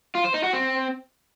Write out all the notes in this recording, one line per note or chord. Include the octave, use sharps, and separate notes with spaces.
F4
C5
D#4
F#4
C4